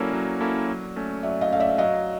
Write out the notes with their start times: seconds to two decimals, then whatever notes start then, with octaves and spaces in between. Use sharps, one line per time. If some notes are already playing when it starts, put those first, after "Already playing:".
Already playing: F#3 A#3 C#4 E4 A4 D5
0.13 F#3
0.40 A#3 C#4 E4 A4
0.67 F#3
0.96 A3 C#4
1.23 F#3 D5 E5
1.41 D#5 F5
1.51 C#4 F5
1.55 A3 D5 E5
1.78 F#3 D#5 F5